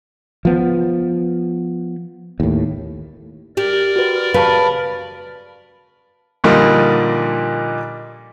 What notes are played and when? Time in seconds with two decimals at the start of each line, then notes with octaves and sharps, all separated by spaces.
0.45 F3 B3
2.40 D#2 A2
3.57 G4 A#4 D5
3.96 F#4 B4
4.34 C#3 B4 F5 A5 B5
6.44 A#2 D3 F3 G3 A#3 D#4